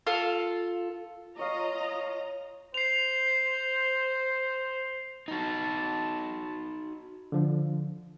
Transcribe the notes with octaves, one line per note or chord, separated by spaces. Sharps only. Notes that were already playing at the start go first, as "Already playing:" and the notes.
F4 A4
F4 C#5 D#5 F5 A#5
C5 C7 F7
D#4 F#4 A5
D3 F3